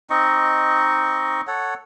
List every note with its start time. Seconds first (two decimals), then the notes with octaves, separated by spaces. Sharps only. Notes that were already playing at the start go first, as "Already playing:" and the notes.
0.10 C4 D#4 D#5 C#6
1.47 A4 C#5 F#5